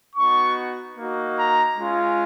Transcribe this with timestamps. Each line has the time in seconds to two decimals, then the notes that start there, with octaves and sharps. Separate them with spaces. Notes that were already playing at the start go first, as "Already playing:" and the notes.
0.16 B3 D#4 F#4 C#6
0.96 A#3 D#4 F#4
1.37 A#5
1.77 G#3 C#4 F4